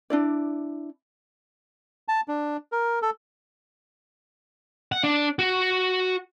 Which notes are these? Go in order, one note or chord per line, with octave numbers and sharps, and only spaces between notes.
D4 E4 D5
A5
D4
A#4
A4
F#5
D4
F#4